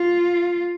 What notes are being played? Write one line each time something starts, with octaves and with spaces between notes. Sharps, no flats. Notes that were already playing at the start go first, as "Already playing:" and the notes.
Already playing: F4